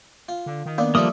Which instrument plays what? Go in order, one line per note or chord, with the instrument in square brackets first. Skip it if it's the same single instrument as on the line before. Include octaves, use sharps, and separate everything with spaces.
[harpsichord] F4
[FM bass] D3
D#3
[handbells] A#3 [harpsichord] B3 D4
[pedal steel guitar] F3 G3 A#3 [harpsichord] A4 D5 E5 [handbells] D#6